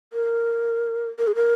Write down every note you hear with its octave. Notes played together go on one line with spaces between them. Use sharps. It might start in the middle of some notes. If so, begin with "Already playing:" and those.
A#4
A#4
G#4
A#4